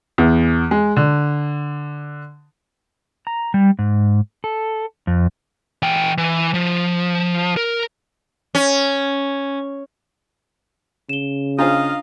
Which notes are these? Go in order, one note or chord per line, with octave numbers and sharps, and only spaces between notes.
E2
G#3
D3
A#5
G3
G#2
A4
F2
E3 G5
E3
F3
A#4
C#4
C#3 E7 G7
D4 F4 G#4 C5 D#5 F5 A#5